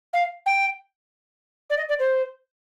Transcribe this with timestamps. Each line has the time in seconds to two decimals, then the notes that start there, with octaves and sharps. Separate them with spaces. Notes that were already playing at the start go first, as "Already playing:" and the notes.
0.13 F5
0.46 G5
1.69 D5
1.77 D#5
1.88 D5
1.99 C5